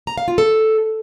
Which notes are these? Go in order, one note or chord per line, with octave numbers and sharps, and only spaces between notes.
A#5
F5
F4
A4